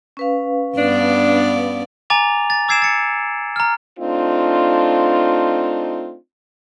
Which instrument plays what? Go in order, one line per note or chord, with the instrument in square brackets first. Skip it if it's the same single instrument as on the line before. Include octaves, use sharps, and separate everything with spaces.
[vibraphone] C#4 B4 F5
[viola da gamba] G2 B3 D5 [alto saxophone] D4
[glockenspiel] G#5 A#5 D6 A6 F7
A6
D6 E6 G#6 C7 D7 E7
A6 C#7
A#5 F6
[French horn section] A3 C4 D4 D#4 F4